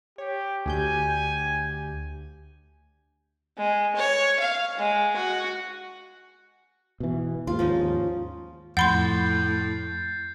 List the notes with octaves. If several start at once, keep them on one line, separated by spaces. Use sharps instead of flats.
G4 C#5
D2 G4 G#5 G6
G#3
C#5
F5
G#3
F#4
B2 E3
D#2 G#2 F4
F3 C#4 D#4
F2 A2 F#5 B5 C6 G6 A6 C7